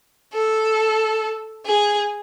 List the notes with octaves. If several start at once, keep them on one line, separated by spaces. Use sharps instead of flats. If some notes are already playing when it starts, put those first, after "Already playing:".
A4
G#4